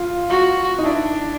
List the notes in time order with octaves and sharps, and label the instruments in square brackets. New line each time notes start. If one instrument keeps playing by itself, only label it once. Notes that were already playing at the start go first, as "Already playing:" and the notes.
Already playing: [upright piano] F4
[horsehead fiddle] F#4
[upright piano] D#4
[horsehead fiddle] D4 [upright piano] E4